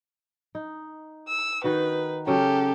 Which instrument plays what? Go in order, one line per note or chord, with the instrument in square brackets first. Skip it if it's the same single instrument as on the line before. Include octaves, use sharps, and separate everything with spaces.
[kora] D#4
[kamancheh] E6
[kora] D#3 D#4 F#4 [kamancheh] B4
[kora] C#3 F#3 C#4 [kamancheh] G4 A4